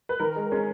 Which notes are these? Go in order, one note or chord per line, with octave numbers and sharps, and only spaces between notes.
B4
D#3 A#4
G#3
G#3 C#4